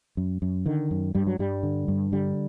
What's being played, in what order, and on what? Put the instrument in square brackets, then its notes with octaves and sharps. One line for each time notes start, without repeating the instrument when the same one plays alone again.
[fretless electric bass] F#2
F#2
D3 D#3
F#2
G2 G3
F#3
G2 G3
D3
G2
D3 G3